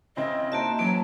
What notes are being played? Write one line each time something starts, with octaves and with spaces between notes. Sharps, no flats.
C#3 C4 E4 D#5
A#3 D#4 F#4 C5 E5 A5
E3 F#3 A#3 C#4